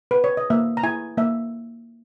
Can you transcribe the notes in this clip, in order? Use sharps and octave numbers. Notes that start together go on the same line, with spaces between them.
B4
C#5
D#5
A#3 E5
A#5
E4 G#5
A#3 E5